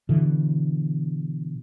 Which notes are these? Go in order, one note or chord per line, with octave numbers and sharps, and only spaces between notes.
B2 D3 E3